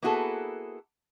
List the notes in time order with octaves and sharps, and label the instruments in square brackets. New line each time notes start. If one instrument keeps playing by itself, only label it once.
[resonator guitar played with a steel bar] A#3 B3 E4 F#4 G#4 A4